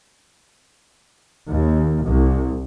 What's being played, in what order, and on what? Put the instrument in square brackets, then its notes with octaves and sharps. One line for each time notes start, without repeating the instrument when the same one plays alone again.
[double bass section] D#2
C2